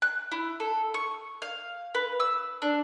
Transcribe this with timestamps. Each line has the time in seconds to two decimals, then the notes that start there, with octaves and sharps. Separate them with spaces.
0.02 F#6
0.32 E4
0.60 A4
0.94 C#6
1.42 F5
1.95 B4
2.20 E6
2.62 D4